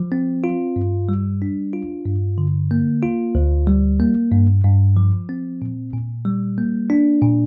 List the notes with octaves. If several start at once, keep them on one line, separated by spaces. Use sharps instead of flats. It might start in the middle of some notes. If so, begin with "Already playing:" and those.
Already playing: F3
C4
F4
G2
G3
D4
F4
G2
D3
A#3
F4
D2
G3
A#3
G2
G2
F3
C4
A#2
A#2
G3
A#3
D4
A#2